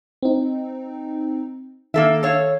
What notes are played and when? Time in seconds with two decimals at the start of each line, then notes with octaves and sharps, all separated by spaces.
0.23 C4 D#4
1.94 D#3 A#3 A4 E5
2.23 A4 C#5 F5